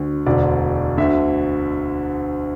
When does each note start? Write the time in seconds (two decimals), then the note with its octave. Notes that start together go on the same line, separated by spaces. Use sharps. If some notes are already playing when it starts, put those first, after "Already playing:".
Already playing: D2 D3
0.26 E1 D2 D3 D5
0.97 D2 D3 E5